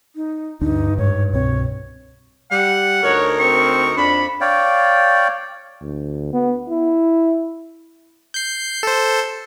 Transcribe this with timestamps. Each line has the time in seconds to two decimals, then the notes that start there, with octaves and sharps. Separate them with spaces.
0.16 D#4
0.61 D2 G2 D4 D#4
0.98 G#2 C#5
1.33 C2 B2 C4 C#5
2.51 G3 F#5
3.03 D2 D#4 A#4 C#5
3.39 C4 C#6
3.97 F2 D4 B5
4.41 C#5 D5 F5 G5
5.81 D2
6.33 B3
6.69 E4
8.34 G6 C7
8.83 A4 C5